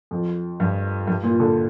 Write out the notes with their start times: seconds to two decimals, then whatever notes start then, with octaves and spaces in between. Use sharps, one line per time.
0.11 F2
0.60 G2
1.07 G2
1.23 A#2
1.40 D3